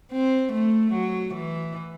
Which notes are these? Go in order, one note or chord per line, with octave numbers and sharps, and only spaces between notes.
C4
A3
F#3
E3